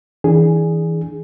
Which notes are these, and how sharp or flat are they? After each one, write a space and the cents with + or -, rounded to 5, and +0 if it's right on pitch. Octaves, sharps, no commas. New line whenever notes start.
E3 -25 D4 +0 G#4 +0